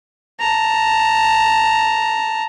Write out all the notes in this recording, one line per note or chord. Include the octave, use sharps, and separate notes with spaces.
A5 A#5